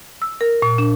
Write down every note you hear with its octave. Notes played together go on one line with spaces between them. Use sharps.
E6
A#4
A#2
D4